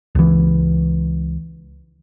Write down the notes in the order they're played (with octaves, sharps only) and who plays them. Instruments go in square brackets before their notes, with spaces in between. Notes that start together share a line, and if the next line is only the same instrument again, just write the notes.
[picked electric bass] C#2 E3